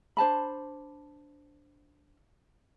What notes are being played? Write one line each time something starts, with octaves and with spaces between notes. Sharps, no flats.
D4 C5 A5 B5